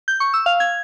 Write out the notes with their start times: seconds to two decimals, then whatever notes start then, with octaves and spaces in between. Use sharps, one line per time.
0.08 G6
0.20 C#6
0.34 E6
0.46 F5
0.60 G#6